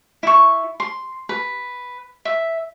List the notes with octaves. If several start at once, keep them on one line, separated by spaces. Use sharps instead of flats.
E4 C#6
C6
B4
E5